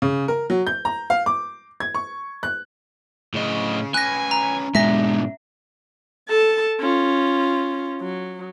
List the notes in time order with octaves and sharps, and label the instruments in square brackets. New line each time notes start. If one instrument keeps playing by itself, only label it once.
[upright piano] C#3
A#4
F#3
G6
A#5
F5
D6
G#6
C#6
F#6
[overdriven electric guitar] A2 D#5 [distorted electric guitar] C#3
[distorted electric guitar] C#4 B4 [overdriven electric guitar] G#5 [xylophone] F#6 A#6
[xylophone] A#5
[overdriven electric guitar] G#2 B2 [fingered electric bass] G#3 [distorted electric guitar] D4 A#5 [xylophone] E5 A#6
[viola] A4 A5
C#4 F4
F#3